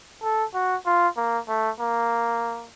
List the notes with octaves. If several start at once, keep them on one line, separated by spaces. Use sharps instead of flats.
A4
F#4
F4
A#3
A3
A#3